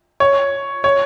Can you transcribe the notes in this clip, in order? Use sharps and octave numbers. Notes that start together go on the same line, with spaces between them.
C#5
C#5